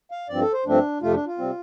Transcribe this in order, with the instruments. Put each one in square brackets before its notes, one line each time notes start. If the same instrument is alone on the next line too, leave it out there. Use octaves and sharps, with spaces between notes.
[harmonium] F5
G2 F3 C4 D5
A4
C5
G2 F3 A3 C4 D4
F2 C3 A3 F4
D4
F4
C3 G3 C4